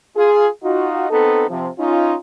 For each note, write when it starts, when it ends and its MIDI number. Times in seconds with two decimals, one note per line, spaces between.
0.15 0.47 65
0.15 0.47 68
0.63 1.09 63
0.63 1.09 65
0.63 1.09 66
1.10 1.45 59
1.10 1.45 60
1.10 1.45 63
1.10 1.45 69
1.50 1.68 48
1.50 1.68 53
1.79 2.16 61
1.79 2.16 63
1.79 2.16 65